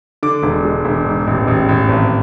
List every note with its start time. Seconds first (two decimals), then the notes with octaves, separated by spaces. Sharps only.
0.23 D3 D6
0.43 E1
0.65 G#3
0.85 E1
1.05 G#2
1.27 A1
1.47 A1
1.69 A1
1.89 G#1